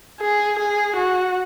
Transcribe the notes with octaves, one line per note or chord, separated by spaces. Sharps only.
G#4
G#4
F#4